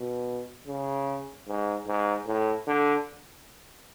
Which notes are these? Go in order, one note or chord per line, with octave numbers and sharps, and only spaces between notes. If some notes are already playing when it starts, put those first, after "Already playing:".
Already playing: B2
C#3
G#2
G#2
A2
D3